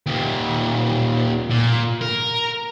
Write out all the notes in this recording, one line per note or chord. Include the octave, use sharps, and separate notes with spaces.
D#2 A#2
A#2
A#4